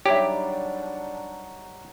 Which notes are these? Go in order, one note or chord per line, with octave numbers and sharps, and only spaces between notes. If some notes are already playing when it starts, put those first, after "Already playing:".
F#3 G3 D4 D#4 G4 C#5 E5